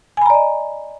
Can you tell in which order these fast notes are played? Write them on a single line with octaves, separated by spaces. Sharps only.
G#5 B5 A#5 D5 D#5